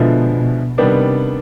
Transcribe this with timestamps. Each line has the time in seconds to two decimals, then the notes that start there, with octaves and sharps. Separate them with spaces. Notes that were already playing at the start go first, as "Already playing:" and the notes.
Already playing: B2 D3 F3 G#3 B3 E4
0.32 B2
0.78 C3 D#3 G3 B3 D4